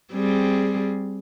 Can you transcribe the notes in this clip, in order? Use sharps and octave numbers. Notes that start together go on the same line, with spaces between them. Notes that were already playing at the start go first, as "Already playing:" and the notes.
G3 C4 G#4